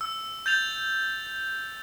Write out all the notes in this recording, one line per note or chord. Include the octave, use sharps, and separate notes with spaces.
E6
G6 A6 F7